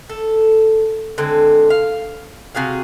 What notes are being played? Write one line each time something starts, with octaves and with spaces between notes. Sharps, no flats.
A4
D3 G#3 C4
F5
C3 F#4 G#4 F5